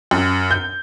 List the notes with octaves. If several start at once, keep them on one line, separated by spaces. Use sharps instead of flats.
F#2
G6